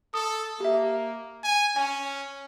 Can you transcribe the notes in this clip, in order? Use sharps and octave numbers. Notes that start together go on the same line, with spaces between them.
A4 D#6
A#3 G4 E5
G#5
C#4 G#5